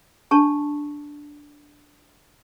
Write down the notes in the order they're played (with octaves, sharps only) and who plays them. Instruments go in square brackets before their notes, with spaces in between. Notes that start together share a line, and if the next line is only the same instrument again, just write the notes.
[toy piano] D4 A5 C#6